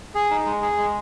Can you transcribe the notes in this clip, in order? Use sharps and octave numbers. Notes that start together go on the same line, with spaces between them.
G#4
D#4
G#3
G#4
G#3